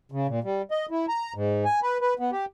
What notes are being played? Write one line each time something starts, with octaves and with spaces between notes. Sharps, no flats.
C#3
A#2
G3
D#5
E4
A#5
G#2
G#5
B4
B4
B3
G4